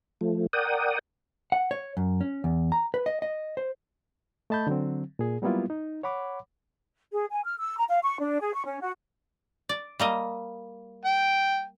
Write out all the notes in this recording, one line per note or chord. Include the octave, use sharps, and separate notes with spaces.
F3 A3
A#4 D5 F#5 G5 D#6
F#5
C#5
F#2
C#4
E2
A#5
B4
D#5
D#5
C5
A3 D#5 A5 B5 G6
D3 F#3 C4
A#2 G#4
F#3 G3 A#3 B3 E4 F4
D#4
C#5 F#5 B5 D6
G#4
G#5
F6
E6
A#5
F5
C#6
D4
G#4
C#6
C#4
F#4
D5
G3 A#3 D#5
G5